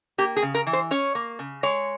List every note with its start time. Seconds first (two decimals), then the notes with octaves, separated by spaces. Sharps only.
0.18 A#3 G4
0.36 G#4
0.42 C#3
0.55 A#4
0.67 E3
0.73 C5
0.91 C#4 C#5
1.15 A#3
1.39 C#3
1.63 G#3 C#5